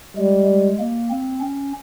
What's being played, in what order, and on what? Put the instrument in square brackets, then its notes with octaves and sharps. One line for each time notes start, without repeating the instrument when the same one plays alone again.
[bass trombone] G3 [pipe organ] G#3
[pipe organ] G#3
A#3
C4
C#4